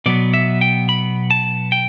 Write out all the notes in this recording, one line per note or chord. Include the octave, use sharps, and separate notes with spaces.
B2 F#3 B3 D5
E5
G5
B5
A5
G5